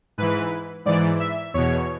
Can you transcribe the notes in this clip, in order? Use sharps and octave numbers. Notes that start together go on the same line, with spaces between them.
G#2 E3 B4
G#2 E3 D5
E5
E2 B2 C#5